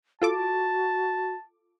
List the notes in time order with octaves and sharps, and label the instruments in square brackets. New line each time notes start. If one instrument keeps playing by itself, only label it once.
[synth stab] F4 A4 D6 [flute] F#4 [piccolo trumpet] A5